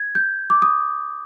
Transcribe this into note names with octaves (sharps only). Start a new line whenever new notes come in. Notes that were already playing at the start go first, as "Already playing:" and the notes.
Already playing: G#6
G6
D6
D#6